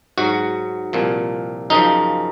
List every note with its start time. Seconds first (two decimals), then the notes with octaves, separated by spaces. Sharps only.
0.18 G#2 F#3 F#4
0.93 C2 A#2 F3
1.70 F#2 C#3 F3 D#4